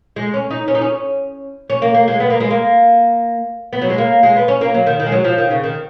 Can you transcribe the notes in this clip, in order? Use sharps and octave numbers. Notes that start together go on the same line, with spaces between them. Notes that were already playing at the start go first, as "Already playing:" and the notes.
G#3
C#4
D#4
C#4
D#4
C#4
C#4
A#3
A#3
G#3
B3
A#3
G#3
A#3
B3
F#3
G#3
A#3
G#3
B3
C#4
A#3
F#3
D#3
D#3
G#3
F#3
F3
D#3
C#3
D#3